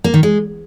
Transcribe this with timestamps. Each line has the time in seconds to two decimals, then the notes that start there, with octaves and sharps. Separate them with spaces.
0.04 A#3
0.14 D#3
0.23 G#3